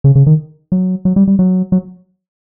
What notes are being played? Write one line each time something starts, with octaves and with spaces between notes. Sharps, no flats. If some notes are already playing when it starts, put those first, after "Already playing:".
C#3
C#3
D#3
F#3
F#3
G3
G3
F#3
F#3